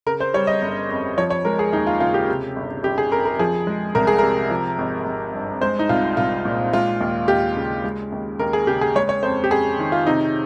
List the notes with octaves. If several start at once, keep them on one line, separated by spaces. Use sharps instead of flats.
C#3 A#4
C5
G3 C#5
D#5
G1
F2
F3 C#5
C#5
G#3 A#4
G#4
D#2 D#4
F4
C#3 F4
G4
C3
G1
G1 G4
G#4
F2 A#4
A#4
F3 G#4
G#3
C2 A#4
G#4
C3 A#4
F3
G#1
G#1
G2
G#3 C5
D#4
C2 F4
C2 F4
A#2
G#3 F4
D#2
D#2 G4
C#3
G#3
D#2
D#2 A#4
G#4
C#3 G4
G#4
G#3 C#5
C#5
F2 C5
G4
F2 G#4
D#3
F4
C3 D#4